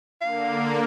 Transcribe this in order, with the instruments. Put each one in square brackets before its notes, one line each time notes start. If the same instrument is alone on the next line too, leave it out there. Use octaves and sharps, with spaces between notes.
[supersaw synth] D3 A#3 [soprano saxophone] F5